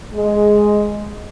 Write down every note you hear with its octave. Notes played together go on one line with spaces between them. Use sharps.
G#3